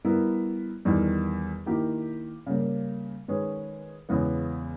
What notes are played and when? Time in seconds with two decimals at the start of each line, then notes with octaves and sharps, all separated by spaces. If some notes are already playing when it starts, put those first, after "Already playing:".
0.04 G3 B3 E4 A#4
0.85 E2 D#3 G3
1.66 D#3 A#3 E4 G4 A#4
2.46 C#3 G3 A#3
3.28 D#3 G#3 C#4 G#4 B4
4.09 E2 C#3 G#3 B3